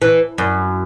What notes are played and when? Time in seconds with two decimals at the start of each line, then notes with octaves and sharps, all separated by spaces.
0.02 E3
0.38 F#2